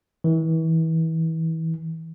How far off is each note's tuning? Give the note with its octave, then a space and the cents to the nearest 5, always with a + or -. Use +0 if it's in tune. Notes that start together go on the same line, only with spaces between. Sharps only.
E3 -30